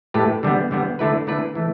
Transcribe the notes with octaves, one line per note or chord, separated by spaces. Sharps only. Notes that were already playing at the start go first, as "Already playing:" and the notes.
A2 A3 G4 B4
D3 G3 B3
D3 G3 B3
D3 A3 E4 B4
D3 A3 E4 B4
E3 A3